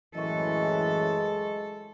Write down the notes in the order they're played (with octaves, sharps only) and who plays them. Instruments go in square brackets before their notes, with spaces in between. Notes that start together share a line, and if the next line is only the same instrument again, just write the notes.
[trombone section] F#2 A2 E3 [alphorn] G#3 [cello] A4 [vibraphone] D#5 C#6